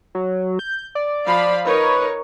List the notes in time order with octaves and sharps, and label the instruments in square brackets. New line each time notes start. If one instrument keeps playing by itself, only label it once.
[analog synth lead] F#3
G6
D5
[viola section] F3 F5 B5
[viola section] D#4 A#4 C#5 [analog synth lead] B4